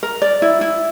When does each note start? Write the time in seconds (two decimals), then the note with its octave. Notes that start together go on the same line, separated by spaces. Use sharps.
0.03 A#4
0.22 D5
0.42 E4
0.61 E4